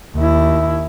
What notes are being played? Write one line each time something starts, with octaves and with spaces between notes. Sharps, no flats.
D#2 E4